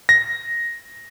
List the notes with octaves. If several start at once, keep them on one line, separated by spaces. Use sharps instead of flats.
A#6